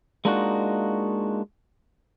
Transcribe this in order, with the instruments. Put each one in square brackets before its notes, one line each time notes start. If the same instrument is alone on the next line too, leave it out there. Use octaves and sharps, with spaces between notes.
[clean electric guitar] G#3 A#3 D4 D#4 F4 F#4